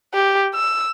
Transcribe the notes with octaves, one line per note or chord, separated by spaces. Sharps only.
G4
E6